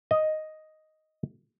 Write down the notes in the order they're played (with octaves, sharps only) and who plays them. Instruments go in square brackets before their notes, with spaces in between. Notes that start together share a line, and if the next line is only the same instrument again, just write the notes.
[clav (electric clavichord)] D#5